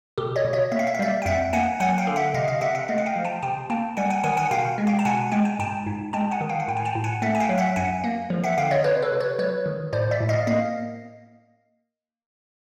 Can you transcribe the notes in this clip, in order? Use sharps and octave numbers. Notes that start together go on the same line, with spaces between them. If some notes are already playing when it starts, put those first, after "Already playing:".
B2 G4 A4
C#5 D#5
B2
C#5 D#5
A#3 E5
F5
E5
F5
G3 D5 E5
G5
F2 E5 F#5
A#3 F#5 G#5
F#3 F#5 G#5
F5 G5
D3
E5 F#5
C3 D#5 F5
D#5 F5
C3 E5 F#5
E5 F#5
A3 D#5 F5
F#5
F5 G5
F3
G5 A5
C3 G5 A5
A#3 G5 A5
G3 F#5 G#5
F#5 G#5
D#3 F#5 G#5
F#5 G#5
B2 F5 G5
G#3
F5 G5
A5
B2 F#5 G#5
G#3 G5
G#5
G#2 G5 A5
G#2
G#3 G5 A5
F#5 G#5
D#3
F5 G5
F#5
A2 G5
G#5
G5 A5
A2
F#5 G#5
A3 E5 F#5
G#5
F5 G5
F#3
E5 F#5
F#2 F#5 G#5
A#3
F3
E5 F#5
D3 F5 G5
C#5 D#5
C3 B4 C#5
A4 B4
C3
B4 C#5
F#3 B4 C#5
D#3
A2 C5 D5
D5 E5
A2
D#5 F5
A#3 D#5 F5